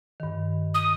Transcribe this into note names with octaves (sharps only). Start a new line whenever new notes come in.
G2 D#3
D#6